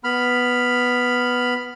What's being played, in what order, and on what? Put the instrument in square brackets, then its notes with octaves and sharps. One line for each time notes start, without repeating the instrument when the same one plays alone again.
[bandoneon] B3 B5 F6